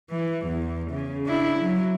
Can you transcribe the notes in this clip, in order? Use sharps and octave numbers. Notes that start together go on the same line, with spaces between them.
E3
E2
C#3
D4 E4
F#3